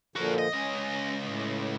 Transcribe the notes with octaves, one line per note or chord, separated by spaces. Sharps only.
A#2 D3 F3 F#4 A#4
D#5
C#2 C#4 D#5
A2